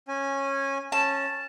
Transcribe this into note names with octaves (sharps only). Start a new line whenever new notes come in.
C#4 G#5
C#4 A5